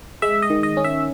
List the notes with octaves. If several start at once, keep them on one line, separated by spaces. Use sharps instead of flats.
G#3 E5
D#5
D#3
D#5
C#4
E5